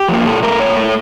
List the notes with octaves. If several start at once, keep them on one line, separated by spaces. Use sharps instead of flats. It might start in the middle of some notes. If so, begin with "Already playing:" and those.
Already playing: G4
F3 A#3
A#2 A4
A3 A#4
A#2 C#5
A3